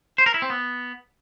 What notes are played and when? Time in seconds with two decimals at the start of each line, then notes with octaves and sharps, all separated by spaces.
0.18 C5
0.26 A#4
0.34 E4
0.42 C4
0.50 B3